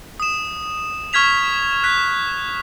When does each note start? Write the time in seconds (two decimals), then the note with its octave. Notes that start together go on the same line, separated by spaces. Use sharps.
0.20 D#6 E7
1.13 C#6 F6 G#6 B6 F7
1.84 F#6 B6